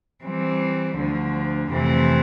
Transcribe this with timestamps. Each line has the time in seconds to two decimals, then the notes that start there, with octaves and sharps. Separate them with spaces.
0.24 E3 G3 C4
0.97 D2 D3 F3
1.70 F2 C3 E3 A3 C4